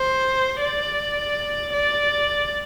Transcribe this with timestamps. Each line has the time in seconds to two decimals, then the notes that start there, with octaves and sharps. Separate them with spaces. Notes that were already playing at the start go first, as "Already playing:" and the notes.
Already playing: C5
0.61 D5
1.73 D5